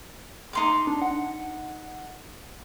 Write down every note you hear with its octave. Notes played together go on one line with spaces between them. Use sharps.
D#4 C6 D6
D4
F#5